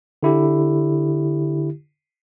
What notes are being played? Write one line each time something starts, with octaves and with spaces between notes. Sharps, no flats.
D3 E4 G4